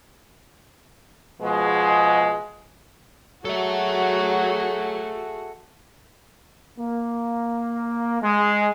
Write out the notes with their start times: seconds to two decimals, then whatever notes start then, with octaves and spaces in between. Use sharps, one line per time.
1.42 B2 F3 G#3
3.45 F#3 F#4 G#4 A4 E5
6.78 A#3
8.22 G#3